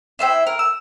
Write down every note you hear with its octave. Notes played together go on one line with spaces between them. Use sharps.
E4 C5 E5 G5
A#4
E6